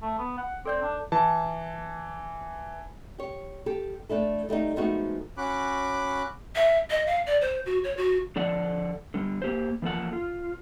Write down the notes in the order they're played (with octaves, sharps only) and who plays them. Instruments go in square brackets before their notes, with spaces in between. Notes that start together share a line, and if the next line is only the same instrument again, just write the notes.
[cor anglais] A3
B3
F#5
[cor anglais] C4 [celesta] A4 D5 G6
[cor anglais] D4
[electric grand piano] E3 A5
[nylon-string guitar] G4 C#5
G4 A4
A3 D4 E4 A4
G3 A3 C4 D#4
F3 G#3 A3 B3 D#4 F#4
[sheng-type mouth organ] C#4 F#4 B5 D6 F#6
[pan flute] E5
D#5
F5
D5
C5
F#4
C#5
F#4
[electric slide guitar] D3 F3 A4 D5 D#5 F#5
D3 G3
A#3 G4 C5
E3 F3 A#3 F4 A4 F#5
F4